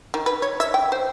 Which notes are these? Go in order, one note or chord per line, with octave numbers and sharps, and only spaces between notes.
D#3
B4
C#5
E5
G5
C5